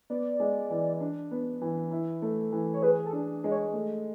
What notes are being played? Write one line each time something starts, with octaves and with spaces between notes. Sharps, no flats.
B3 D5
G#3
E3
D4
B3
E3
E4
A3
E3
C#5
G#4 B4
A4
D4
G#3
C#5
A3